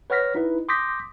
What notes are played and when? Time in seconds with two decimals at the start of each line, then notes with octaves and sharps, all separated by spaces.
0.10 B4 C#5 F#5 F6 A#6 B6
0.35 D#4 E4 B4
0.69 C6 D6 D#6 G6 A#6 B6